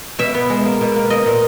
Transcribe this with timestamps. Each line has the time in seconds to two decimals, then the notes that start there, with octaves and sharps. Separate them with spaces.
0.19 B2 E5
0.34 B3
0.50 G#3
0.65 A#3
0.81 B2
0.96 A#3
1.10 A#3 D#5
1.26 A#2